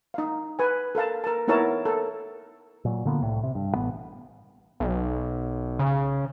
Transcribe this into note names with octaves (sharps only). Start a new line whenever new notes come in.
D#4 F5
B4 G#5
A4 A#4 F5 A5
A#4 A5
B3 D#4 E4 A#4 C#5 A5
A4 A#4
A#2 F#3
A#2 D3 A#3 B3
C2 A2
C3
G2
A1 B3
B1
C#3